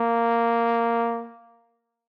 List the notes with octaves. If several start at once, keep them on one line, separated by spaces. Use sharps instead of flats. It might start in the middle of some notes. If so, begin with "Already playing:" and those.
Already playing: A#3